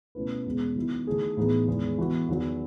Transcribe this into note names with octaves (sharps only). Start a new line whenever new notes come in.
B2 A3 C#4 E4 B4
E2 B2 G#3 B3
D#3 F#3 B3 E4
D#3 A3 E4 G#4
A2 E3 B3 D#4 G#4
E2 D#3 G#3
E3 B3 F#4
E2 D#3 F#3